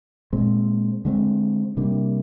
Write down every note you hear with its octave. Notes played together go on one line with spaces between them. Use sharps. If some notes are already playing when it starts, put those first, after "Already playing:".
A#2 G#3 C4
D3 G#3 C4
C3 G3 A#3 D4